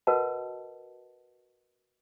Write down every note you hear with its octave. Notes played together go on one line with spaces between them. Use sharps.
F#4 A#4 B4 D#5 F#5 A5